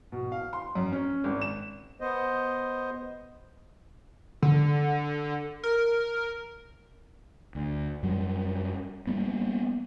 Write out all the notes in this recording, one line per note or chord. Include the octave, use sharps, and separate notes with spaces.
B2
F5
C6
F#2
C#4
G#1
E7
B3 C5 D#5
D3
A#4
D2
F#2 F#3 G3
G3 A#3 B3